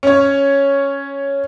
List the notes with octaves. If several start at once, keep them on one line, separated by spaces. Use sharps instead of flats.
C#4 C#5